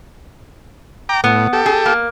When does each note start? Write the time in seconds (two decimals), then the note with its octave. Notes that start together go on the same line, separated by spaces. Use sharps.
1.09 G5 A#5 D6
1.24 A2 B3
1.53 G4 A4
1.66 G#4
1.86 A#3